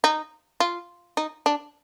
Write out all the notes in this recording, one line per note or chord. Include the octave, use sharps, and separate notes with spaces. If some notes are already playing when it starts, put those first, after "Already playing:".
D#4
F4
D#4
D4